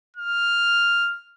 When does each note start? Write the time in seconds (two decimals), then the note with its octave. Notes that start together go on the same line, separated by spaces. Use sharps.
0.16 F6